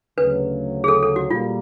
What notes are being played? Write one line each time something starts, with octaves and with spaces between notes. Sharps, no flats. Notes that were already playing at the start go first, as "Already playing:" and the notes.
D2 C#3 F#3 B4
G#4
A4
A4
F#4
A#2 G3 A#3 F4